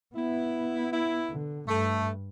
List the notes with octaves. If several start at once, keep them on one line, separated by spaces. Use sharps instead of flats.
B3 E4
E4
D3
G2 A3